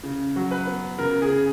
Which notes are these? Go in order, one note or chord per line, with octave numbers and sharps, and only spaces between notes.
C#3
F#3
B4
B3
C#3 A#4
G#4
C#3